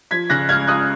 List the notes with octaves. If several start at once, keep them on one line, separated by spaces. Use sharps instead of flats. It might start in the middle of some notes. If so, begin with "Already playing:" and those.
F3 G#6 B6
C#3 F#6 A#6
C#2 F6 G#6
C#2 D#6 F#6